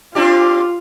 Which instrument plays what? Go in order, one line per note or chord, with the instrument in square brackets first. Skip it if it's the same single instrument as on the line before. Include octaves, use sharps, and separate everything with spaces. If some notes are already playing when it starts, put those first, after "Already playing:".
[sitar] C4 D4 G4 [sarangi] F4